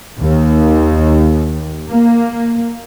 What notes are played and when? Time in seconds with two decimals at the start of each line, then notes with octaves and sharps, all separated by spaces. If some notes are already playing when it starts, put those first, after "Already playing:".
0.20 D#2
1.88 A#3